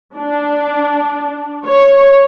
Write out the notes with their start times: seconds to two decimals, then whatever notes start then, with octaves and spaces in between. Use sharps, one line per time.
0.16 D4
1.66 C#5